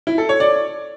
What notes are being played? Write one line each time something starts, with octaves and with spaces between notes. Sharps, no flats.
E4
A4
C#5
D5